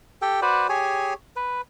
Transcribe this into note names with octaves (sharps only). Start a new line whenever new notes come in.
G4 A4 G5
F#4 B4 C5 D5
G4 G#4 C#5 G#5
B4